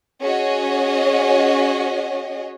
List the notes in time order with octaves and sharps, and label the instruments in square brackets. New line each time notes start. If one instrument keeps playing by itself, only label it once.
[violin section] C#4 F#4 G#4 C#5 D#5